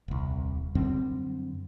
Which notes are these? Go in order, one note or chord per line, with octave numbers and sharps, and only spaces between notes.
D#1 C2
F#2 D3 G3 C4